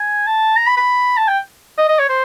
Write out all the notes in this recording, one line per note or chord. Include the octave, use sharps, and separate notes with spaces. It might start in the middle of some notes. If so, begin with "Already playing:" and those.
Already playing: G#5
A5
A#5
B5
B5
A5
G5
D#5
D#5
C#5
C5